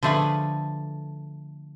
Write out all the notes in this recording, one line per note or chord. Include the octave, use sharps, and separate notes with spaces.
D3 F3 A3 G#4 B4 G#5